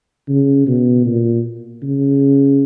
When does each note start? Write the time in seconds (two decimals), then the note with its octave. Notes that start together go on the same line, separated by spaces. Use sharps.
0.28 C#3
0.67 B2
1.06 A#2
1.83 C#3